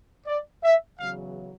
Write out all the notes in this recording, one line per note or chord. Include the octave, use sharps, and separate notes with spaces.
D5
E5
E2 C#3 F#3 F5